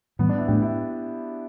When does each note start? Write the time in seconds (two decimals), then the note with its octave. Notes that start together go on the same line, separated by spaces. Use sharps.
0.19 A2 E3 G3 B3
0.29 D4
0.38 E4
0.48 A2 A3 D4 G4
0.62 E4